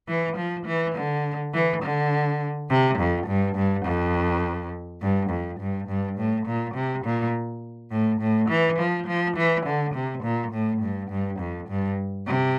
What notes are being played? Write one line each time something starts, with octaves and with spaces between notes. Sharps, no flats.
E3
F3
E3
D3
E3
D3
C3
F2
G2
G2
F2
G2
F2
G2
G2
A2
A#2
C3
A#2
A2
A2
E3
F3
F3
E3
D3
C3
A#2
A2
G2
G2
F2
G2
C3